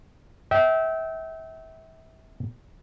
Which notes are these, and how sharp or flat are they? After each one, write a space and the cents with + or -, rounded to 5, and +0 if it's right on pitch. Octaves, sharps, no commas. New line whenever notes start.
E5 -30 G5 -25